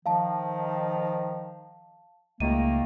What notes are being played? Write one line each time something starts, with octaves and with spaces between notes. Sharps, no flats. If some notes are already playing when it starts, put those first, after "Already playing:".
D#3 F3 F5 A5
C#2 D#3 A3 A#3 D#7